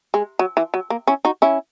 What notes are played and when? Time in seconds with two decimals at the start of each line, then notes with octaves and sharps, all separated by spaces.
0.14 G#3
0.39 F#3
0.57 E3
0.74 F#3
0.90 A#3
1.07 C#4 E4
1.25 D#4 F#4
1.42 C#4 E4